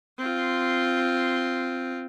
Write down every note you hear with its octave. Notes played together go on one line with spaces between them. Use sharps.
C4 F4